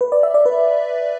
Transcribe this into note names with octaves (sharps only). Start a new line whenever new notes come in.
B4
D5
E5
D5
B4